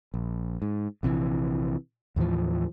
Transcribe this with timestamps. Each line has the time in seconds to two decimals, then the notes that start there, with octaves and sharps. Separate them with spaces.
0.14 A#1
0.62 G#2
1.03 A#1 C3 D#3 E3
2.16 D#2 A2 E3 F3